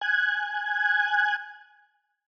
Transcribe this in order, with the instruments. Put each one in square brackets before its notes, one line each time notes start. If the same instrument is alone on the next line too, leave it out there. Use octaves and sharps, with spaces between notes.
[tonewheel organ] G#5 F#6 G#6